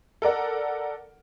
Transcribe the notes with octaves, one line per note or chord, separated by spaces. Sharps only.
A4 A#4 D5 F#5